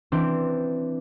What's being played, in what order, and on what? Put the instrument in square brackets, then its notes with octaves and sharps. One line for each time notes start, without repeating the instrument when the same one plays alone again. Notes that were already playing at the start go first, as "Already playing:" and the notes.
[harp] E3 C4 D4